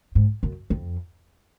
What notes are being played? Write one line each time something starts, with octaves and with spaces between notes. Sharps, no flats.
G#2
F#2
F2